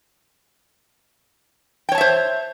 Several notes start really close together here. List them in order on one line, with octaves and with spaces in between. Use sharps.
G5 C#5 A5 E5 C5